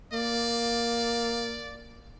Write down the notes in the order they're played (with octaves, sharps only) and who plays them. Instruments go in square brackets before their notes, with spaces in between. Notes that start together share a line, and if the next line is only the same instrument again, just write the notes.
[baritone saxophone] A#3 [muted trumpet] D5